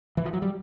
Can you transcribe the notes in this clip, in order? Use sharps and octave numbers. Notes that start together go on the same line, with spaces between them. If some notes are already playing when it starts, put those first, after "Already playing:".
E3
F3
F#3
G3